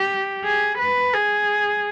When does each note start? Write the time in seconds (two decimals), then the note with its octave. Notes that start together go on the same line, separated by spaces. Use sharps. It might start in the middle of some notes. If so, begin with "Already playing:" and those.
Already playing: G4
0.44 G#4
0.79 B4
1.14 G#4